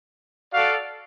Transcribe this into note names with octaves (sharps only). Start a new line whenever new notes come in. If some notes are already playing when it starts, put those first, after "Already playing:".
F#4 A4 D5 F5